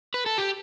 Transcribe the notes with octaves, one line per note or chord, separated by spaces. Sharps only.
B4
A4
G4